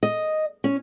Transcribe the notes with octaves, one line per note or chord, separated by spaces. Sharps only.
D#5
C#4